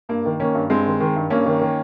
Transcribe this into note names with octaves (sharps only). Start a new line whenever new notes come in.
G2 A#3
D#3
D#3 A#3 C#4
G2
G2 G#3 C4
D#3
D#3
G2
G2 A#3 C#4
D#3
D#3